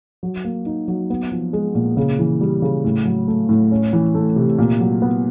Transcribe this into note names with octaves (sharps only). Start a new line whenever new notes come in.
F#3
A#3
D#4
F#3
B3
F3
G#3
A#2
C#3
E3
G3
C#3
A2
F#3
A3
A2
C#4
E3
A3
C3
A#2
F#3
B3